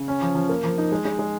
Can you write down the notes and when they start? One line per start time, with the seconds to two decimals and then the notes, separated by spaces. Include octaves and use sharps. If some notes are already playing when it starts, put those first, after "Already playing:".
Already playing: C#3
0.08 C#4
0.22 F3
0.35 F3
0.49 A#3
0.64 F3
0.78 D#4
0.92 G#3
1.05 G#3
1.19 G#3